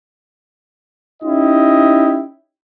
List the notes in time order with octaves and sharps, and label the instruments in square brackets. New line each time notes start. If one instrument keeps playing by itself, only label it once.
[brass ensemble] C#4 D#4 E4 G4 D#5